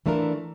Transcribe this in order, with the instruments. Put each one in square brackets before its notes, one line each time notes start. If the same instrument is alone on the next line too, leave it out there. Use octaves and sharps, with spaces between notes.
[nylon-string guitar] E3 A3 D4 F4 A#4